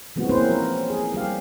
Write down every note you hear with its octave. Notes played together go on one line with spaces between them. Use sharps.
E3 G#3 B3 C4 F#4
A#3 C4 C#4 B4 C5
F3 F#4 A#4
G#4
G3 G4 F5